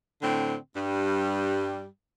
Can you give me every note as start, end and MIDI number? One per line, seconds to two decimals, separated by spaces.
0.22 0.56 45
0.22 0.56 50
0.22 0.56 60
0.76 1.86 43
0.76 1.86 55